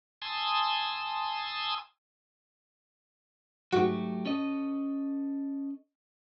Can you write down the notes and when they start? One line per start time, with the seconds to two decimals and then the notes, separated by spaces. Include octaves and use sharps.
0.22 G#5 A5 C6 D#6 E6
3.72 G#2 F#3 A3 F#4 G4
4.25 C#4 A4 D#5